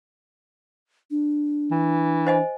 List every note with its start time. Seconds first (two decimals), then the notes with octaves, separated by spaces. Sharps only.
1.11 D4
1.71 E3
2.27 C5 D#5 G#5